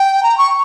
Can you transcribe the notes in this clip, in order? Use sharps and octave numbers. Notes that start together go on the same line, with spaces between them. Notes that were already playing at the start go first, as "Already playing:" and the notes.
Already playing: G5
A#5
C#6